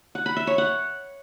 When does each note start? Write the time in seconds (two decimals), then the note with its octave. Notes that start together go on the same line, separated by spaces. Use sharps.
0.15 F#5
0.26 B5
0.37 E5
0.47 C#5
0.58 F#5